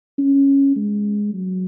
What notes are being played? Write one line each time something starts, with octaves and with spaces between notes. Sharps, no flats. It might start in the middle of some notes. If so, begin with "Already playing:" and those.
C#4
G#3
F#3